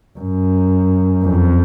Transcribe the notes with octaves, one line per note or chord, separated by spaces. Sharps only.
F#2
F2